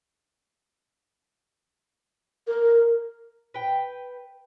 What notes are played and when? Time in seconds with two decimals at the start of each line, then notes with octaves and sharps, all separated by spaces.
2.48 A#4
3.54 B4 G5